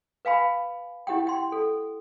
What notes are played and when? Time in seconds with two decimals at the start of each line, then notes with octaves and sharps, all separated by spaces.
0.25 B4 F5 G#5 B5
1.07 E4 G4 F#5 G5
1.27 G5 C6
1.52 A4